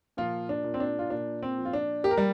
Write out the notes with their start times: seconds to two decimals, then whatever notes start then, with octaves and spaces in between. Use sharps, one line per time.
0.17 A#2 F3 F4
0.49 D4
0.64 A#2
0.74 C4
0.80 D4
0.99 F4
1.10 A#2 D4
1.43 C4
1.58 F3
1.65 F4
1.73 D4
2.04 A#3 G4
2.11 A#4
2.18 G3